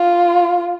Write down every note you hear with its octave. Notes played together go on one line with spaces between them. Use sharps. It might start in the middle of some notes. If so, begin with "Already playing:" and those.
Already playing: F4